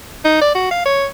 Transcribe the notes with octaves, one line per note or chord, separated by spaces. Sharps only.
D#4
D5
F#4
F5
C#5